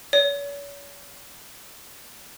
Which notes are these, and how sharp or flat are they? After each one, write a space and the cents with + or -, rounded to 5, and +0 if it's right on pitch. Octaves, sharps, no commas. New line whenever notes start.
C#5 +40